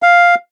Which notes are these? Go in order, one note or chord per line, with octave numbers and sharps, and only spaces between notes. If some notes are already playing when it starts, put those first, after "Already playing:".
F5